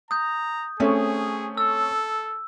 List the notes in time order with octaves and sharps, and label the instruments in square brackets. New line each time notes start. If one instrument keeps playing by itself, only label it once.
[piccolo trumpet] A#5 [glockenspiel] D#6 G6
[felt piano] A3 C4 C#4 [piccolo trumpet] G#4
[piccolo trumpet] A4 [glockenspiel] E6